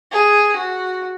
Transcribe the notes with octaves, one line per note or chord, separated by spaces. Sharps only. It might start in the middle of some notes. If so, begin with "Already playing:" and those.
G#4
F#4